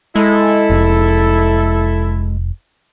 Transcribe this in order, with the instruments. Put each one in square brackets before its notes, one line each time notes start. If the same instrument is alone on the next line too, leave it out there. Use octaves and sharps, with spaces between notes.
[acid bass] G#3 [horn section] E4 A4
[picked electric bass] F1